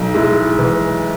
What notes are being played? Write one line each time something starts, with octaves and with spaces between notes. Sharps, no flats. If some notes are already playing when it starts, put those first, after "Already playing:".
Already playing: B1 D#4
G#3 E4
E3